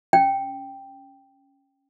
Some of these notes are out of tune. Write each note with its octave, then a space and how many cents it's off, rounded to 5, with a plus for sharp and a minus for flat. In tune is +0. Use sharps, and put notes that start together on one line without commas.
C#4 +0 G5 +0